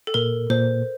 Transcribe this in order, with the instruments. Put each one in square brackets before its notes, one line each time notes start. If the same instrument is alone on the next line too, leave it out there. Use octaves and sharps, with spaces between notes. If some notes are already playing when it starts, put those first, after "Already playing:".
[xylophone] A4
[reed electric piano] A#2 [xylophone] A#4
[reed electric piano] A#2 [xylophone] C5